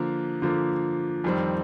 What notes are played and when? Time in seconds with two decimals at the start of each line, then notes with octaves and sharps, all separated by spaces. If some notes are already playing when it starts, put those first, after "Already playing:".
Already playing: D3 F3 A#3
0.42 D3 F3 A#3
1.24 F2 D#3 G3 C4